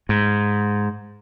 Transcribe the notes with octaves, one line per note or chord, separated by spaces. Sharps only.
G#2